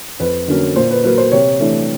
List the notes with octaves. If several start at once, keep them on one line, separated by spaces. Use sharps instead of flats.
F2 B4
D3 F#3 A#3 C#4
A#2 C5
B4
F#3 A#3 B4
C5
C3 C#5
E3 A3 D4